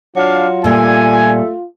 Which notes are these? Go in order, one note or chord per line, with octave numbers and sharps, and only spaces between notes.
F#3 D4 F4 F5
A#2 G3 A3 G#5